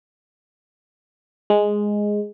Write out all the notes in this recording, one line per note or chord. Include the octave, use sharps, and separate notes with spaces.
G#3